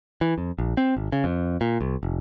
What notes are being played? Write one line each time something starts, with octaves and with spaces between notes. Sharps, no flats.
E3
F2
A#1
C4
G#1
C#3
F2
A#2
C2
F1